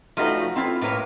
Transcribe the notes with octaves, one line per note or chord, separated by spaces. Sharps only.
F3 G3 A3 D#4 F#4 B4
C4 E4 F4
A2 A#3 B4 C#5